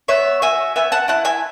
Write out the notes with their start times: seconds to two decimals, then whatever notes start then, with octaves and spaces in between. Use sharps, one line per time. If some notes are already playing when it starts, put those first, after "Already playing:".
0.08 B3 C#5 E5
0.42 F#4 E5 G#5
0.76 B3 E5 G#5
0.92 F#5 A5
1.08 E4 F#5 A5
1.25 E5 G#5